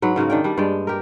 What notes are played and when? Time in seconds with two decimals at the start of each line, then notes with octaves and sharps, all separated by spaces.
0.02 G#2 F#3 B4
0.16 G#2 C#3 A#3 F#4
0.30 D#3 D4 G5
0.44 G3 D4
0.57 G2 G#3 D5 G5
0.87 G4 A#4